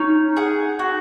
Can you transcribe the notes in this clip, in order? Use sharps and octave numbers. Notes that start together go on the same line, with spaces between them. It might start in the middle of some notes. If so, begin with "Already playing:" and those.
Already playing: C#4 D#4
G#4 F#5
F#4